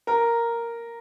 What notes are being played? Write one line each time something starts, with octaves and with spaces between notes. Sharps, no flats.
A#4